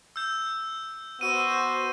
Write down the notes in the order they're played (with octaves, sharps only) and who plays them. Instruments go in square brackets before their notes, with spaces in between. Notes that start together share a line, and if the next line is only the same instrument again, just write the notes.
[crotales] E6 G6
[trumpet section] B3 C5 [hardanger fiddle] F#4 [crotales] E6 D#7